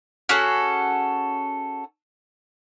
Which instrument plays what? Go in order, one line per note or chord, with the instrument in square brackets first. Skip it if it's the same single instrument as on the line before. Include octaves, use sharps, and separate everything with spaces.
[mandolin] C#4 F#4 G#4 A4